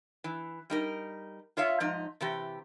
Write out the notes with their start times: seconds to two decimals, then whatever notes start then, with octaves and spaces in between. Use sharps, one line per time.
0.24 E3
0.70 G3 D#4 A#4
1.57 F4 C#5 E5 F5
1.80 G#2 F3 D#4
2.21 C3 E3 G4